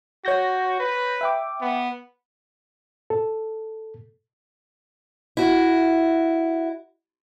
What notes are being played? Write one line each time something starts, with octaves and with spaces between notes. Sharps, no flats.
F#4 C#5 G6 A#6
B4
E5 G5 D6
B3
A4
E4 F#4